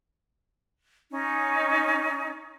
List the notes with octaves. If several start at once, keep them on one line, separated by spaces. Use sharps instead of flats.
C#4 D#4